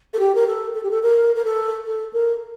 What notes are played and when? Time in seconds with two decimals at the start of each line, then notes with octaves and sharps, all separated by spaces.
0.14 A4
0.19 G4
0.35 A#4
0.47 A4
0.74 A4
0.83 G4
0.91 A4
1.03 A#4
1.36 A#4
1.45 A4
1.85 A4
2.13 A#4